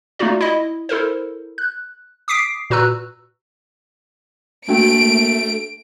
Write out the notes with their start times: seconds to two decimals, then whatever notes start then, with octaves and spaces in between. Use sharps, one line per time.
0.19 A3 A#3 D#4 F4 F#4 D5
0.41 E4 D#5
0.89 E4 A4 A#4 C5
1.58 F#6
2.28 D6 D#6 B6 C7 D7
2.70 A#2 F#4 B4 A#5 E6 F#6
4.69 A3 A#3 D4 F#4 G5 D7